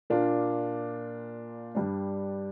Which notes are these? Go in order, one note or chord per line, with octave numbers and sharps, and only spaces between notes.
A#2 A#3 D4 F4
G2 G3 D4